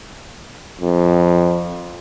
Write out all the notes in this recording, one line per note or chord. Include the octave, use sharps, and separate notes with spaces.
F2